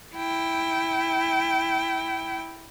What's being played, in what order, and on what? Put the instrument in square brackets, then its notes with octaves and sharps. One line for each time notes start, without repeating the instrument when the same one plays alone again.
[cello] E4 G5